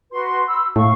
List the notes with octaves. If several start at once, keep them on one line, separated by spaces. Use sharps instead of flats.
F#4 B4 C6
B5 E6
A2 F5 C#6